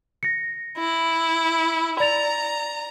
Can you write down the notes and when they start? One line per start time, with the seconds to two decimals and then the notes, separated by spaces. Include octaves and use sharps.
0.23 A#6 C#7
0.77 E4
2.00 D5 A#5 A6 F7